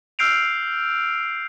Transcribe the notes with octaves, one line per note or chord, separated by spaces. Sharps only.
E6 F6 G6 C7 D7 F7